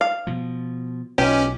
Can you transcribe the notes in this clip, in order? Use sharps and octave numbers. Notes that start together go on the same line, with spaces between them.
F5
B2 F3
B1 C#4 D#4 F4 G4 B4